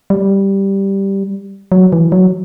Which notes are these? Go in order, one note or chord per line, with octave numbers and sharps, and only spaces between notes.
G3
F#3
E3
F#3